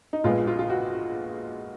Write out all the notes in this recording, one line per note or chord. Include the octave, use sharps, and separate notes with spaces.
D#4
A#1 A#2 G#3 B3 F4
F4
F4
F#4